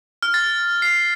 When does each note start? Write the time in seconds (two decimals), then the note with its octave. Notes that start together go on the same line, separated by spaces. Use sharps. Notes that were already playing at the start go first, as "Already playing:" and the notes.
0.23 F6
0.34 A6
0.82 C7